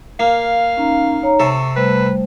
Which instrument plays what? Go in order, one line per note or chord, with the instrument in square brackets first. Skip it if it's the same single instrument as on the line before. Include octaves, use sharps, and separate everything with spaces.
[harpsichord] A#3 [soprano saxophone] F5
[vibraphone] C#4 D#4 A#5
D#4 C#5 A#5
[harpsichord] C3 A4 [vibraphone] C#6
[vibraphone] G3 A3 C5 [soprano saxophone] B4